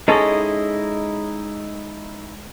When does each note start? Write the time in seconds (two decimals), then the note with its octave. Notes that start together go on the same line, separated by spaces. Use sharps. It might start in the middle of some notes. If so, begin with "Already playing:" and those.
0.08 G#3 C#4 D#4 E4 A4 D#5